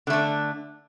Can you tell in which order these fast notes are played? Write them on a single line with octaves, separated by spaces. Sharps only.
D3 A3 D4